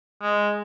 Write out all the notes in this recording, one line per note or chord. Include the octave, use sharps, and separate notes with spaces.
G#3